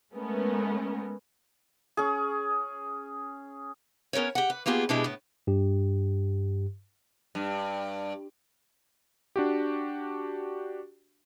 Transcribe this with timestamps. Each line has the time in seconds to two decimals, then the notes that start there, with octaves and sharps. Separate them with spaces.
0.13 G#3 A3 B3 C#4 A#4
1.97 C#4 G#4
4.13 B3 C#4 A#4 B4 C#5
4.35 G4 F#5
4.50 B4
4.66 A#3 B3 F4 G4 G#4
4.89 B2 G#3 D4 E4 G4 G#4
5.04 A2 B3
5.47 G2 G4
7.35 G2
9.36 D4 F#4 G4